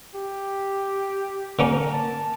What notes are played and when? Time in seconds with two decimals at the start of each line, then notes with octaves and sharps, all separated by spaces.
0.15 G4
1.59 D3 A#3 C#4 A#4
1.93 A5